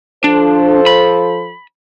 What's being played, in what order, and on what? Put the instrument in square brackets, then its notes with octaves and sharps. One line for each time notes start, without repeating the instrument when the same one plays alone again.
[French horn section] F3 A4 C5 [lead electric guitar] D4
[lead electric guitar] B5